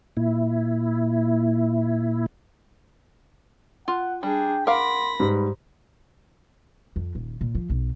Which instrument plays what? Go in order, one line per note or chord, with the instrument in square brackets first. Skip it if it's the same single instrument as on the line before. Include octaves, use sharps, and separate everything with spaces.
[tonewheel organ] A#2 E4
[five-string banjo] F4 [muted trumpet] F#5
[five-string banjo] G3 [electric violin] D4 G#4 [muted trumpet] G5
[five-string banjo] A#4 F5 [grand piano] F#5 D6 [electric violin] B5 A#6 [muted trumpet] C6
[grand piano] G#2 G3 [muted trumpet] B4
[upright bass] F2
D#1
A#2
F3
B1